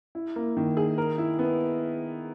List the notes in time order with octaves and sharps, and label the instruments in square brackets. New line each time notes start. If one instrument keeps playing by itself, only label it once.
[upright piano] E4
A#3
D#3
G#4
A#4
E4
B3